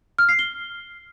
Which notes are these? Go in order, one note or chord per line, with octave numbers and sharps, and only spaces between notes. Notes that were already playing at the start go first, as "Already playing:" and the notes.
F6
C7
G7